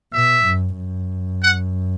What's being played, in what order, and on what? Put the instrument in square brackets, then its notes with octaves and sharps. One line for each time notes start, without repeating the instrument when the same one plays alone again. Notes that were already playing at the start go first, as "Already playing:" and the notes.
[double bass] B2 [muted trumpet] E5
[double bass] F#2
F#2
[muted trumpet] F#5